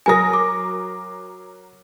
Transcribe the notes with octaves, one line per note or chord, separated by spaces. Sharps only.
F#3 A#4 G#5 D#6 A#6
D6